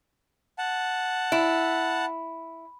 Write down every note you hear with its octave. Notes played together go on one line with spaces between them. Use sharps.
F#5 A5
E4